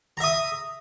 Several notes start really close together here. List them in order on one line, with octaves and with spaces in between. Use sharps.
A#5 E5 D#6